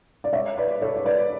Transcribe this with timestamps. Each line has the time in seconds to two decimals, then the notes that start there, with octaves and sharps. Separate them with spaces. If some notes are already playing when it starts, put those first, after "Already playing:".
0.24 D5
0.33 C#5 E5
0.57 B4 D5
0.82 A4 C#5
0.96 C#5
1.05 B4 D5